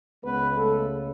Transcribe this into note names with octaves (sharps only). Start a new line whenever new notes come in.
C#2 C#3 G#3 B3 B4
A3 A4